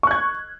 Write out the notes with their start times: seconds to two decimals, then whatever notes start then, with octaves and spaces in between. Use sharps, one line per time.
0.03 C#6
0.07 F#6
0.11 G#6